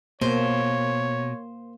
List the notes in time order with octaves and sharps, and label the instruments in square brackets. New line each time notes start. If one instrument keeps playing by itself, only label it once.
[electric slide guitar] B2 [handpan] A#3 [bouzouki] C5 [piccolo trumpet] C#5